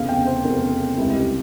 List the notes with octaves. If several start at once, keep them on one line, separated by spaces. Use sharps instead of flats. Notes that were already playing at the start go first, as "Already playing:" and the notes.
Already playing: F1 E2 C#3 F5
G5
C5
F1 E2 C#3 A#4
A#4
C#2 C3 G3 E4
G4